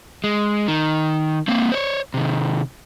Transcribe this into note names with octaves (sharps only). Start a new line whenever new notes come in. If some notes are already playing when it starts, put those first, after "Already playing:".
G#3
D#3
A#3 C4
C5 C#5
C3 D#3